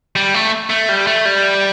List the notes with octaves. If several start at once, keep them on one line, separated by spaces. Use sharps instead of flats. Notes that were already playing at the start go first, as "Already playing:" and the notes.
G3
A3
A3
G3
A3
G3